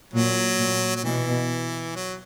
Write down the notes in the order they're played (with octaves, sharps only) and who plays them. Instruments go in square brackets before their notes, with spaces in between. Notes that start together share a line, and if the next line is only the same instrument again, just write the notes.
[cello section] A#2 [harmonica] F#3
[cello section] A#2
[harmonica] F#3
[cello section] B2 [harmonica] E3
[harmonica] F#3